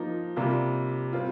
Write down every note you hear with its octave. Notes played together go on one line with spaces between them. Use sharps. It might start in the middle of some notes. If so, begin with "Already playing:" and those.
Already playing: F3 A#3 D#4
C3 G3 A#3 F4
G3 C4 F4